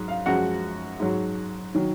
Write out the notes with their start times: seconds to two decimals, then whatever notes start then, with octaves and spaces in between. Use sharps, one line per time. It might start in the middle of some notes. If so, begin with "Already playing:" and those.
Already playing: G#2 F#3
0.08 F5
0.26 F#2 F3 G#3 F#4 F#5
1.00 G#2 F#3
1.75 D#3 F#3